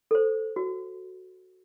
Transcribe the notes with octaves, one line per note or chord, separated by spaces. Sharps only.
A4 C5
F#4